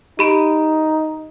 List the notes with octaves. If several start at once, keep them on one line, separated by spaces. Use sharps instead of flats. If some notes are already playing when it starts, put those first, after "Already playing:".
D#4 G4 B5 D7